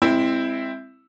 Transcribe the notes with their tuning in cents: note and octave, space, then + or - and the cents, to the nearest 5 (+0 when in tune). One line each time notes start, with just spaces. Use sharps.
G#3 -30 C4 +0 E4 +0